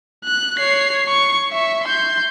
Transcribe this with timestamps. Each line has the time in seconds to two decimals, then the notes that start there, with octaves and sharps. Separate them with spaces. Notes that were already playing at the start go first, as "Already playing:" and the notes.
0.25 F#6
0.58 C#5 C7
1.07 C#6
1.52 E5 C#6
1.84 C6 G6